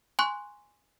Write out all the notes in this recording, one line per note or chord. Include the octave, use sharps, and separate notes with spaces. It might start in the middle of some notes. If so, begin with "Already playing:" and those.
G#5 C6 C#6 F#6